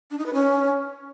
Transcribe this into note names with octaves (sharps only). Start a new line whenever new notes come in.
D4
D#4
B4
C#4